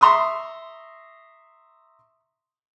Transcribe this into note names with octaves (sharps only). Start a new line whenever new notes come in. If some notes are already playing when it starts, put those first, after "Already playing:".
E5 A#5 C6 C#6 D#6